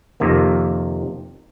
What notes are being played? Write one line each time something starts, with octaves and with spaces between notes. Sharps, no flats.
F2 C3 D#3 A#3